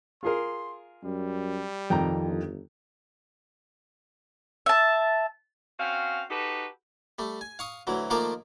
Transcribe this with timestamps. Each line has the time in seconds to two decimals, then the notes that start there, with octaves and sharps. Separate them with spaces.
0.23 F4 G#4 A#4 C6
1.03 F#2 G3
1.90 F2 C3 D#3 G5 A#5
2.23 G1
4.66 E5 A5
5.79 C4 C#4 F#4 F5
6.30 D#4 F#4 G4 A4 B4
7.19 G3 A3
7.41 G#5
7.59 F5 C#6 D#6
7.87 D2 E3 F#3
8.10 D#3 F3 A3 A#3 C5 D6